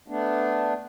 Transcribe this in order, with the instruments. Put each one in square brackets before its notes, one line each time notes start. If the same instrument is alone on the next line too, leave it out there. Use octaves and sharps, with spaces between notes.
[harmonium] A3 B3 D4